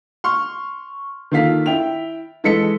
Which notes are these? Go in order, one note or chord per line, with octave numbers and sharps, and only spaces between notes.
C6 C#6 F6
D#3 A#3 F4 A4 F5 B6
E4 G5 F7
E3 G#3 A4 D#5 B6 C#7